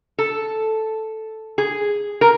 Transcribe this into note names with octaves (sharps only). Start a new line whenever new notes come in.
A4
G#4
A#4